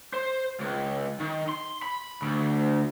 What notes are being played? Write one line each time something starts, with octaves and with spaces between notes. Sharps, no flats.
C5
C#2
D#3
C6
B5
D2